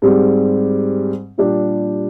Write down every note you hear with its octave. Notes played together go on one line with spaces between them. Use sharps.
G#2 G3 C4 G4
A#2 G3 D4 G4